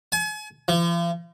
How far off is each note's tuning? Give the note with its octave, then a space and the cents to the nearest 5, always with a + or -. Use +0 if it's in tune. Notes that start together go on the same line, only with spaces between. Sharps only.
G#5 +40
F3 -40